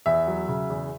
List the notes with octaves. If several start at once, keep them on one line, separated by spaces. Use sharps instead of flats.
E2 E5
F#3
C#3
E2